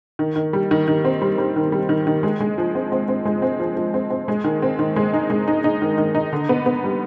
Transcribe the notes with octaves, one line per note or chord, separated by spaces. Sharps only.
D#3
D#3
G3
D#3
D#3
C4
G3
G3
D#3
G3
D#3
D#3
G#3
G#3
F3
C4
C4
C4
G#3
C4
F3
F3
C4
C4
G#3
D#3
C4
D#3
G#3
D#4
G#3
D#4
D#4
D#3
D#3
D#4
D3
B3
B3
G3